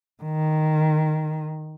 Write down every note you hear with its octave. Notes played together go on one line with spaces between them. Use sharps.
D#3